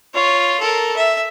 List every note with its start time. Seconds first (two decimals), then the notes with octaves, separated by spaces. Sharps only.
0.14 F4 C#5
0.60 A4 A#4
0.96 E5